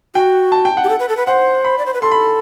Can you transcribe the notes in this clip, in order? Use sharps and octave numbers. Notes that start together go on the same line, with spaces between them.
F#4 G5
A5
G5
F#5
G4
A4
B4
A4
B4
C5 F#5
B5
D5
C5
B4
A4 C6
B5